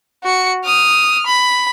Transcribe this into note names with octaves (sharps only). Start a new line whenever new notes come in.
F#4 C#7
D#6 F6
B5